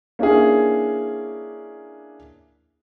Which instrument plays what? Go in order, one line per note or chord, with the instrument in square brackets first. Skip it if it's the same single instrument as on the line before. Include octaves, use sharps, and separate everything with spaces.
[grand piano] A#3 C#4 D4 E4 G#4